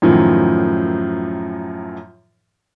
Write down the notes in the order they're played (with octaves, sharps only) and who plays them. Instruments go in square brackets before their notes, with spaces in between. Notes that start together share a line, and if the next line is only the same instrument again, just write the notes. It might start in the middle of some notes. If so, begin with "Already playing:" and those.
[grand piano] F#2 A2 D#3 F3